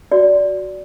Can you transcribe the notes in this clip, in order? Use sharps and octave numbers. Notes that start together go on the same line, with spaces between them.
F#4 D5